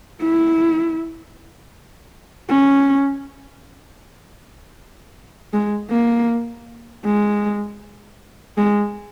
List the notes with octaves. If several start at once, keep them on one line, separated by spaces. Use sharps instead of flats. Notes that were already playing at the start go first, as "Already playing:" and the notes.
E4
C#4
G#3
A#3
G#3
G#3